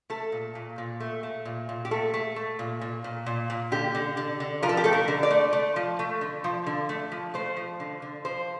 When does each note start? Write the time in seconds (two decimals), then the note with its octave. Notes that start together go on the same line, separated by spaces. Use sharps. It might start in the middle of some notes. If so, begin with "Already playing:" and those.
0.10 A3 A4
0.32 A#2
0.55 A#2
0.78 A#2
1.00 A3
1.23 A3
1.45 A#2
1.69 A#2
1.85 G4
1.91 A3 A4
2.14 A3
2.36 A3
2.59 A#2
2.81 A#2
3.04 A#2
3.26 A#2
3.50 A#2
3.72 D3 G4
3.95 D3
4.17 D3
4.40 D3
4.63 F3 A#4
4.69 A4
4.77 G4
4.84 A3 A4
4.93 A#4
5.08 D3
5.23 D5
5.30 A3
5.53 A3
5.76 F3
5.99 A3
6.21 D3
6.44 F3
6.67 D3
6.89 A3
7.12 F3
7.34 A3 C5
7.57 F3
7.80 D3
8.02 D3
8.25 F3 C5